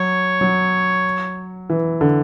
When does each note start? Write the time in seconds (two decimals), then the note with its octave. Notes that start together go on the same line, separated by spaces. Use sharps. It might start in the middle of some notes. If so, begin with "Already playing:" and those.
Already playing: F#3 C#5
0.41 F#3
1.70 E3
2.01 D3